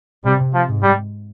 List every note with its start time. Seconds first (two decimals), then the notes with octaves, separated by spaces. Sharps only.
0.25 C3 G3
0.54 F3
0.69 G#2
0.83 G3